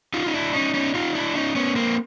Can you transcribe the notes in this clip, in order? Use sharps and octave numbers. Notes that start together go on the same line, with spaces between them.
D#4 F4
D#4
D4 E4
C#4 D#4
C#4 D#4
D#4 F4
D4 E4
C#4 D#4
B3 C#4
A#3 C4